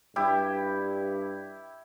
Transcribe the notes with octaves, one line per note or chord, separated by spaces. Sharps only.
G2 E4 G4